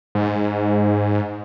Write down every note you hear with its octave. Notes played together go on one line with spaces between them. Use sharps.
G#2